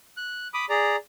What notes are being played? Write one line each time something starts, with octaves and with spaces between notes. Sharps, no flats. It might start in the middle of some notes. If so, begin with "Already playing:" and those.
F#6
B5 D6 D#6
G#4 D5 A#5